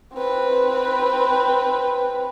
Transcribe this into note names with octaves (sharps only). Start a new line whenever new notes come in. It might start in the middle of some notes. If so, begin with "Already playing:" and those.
C4 B4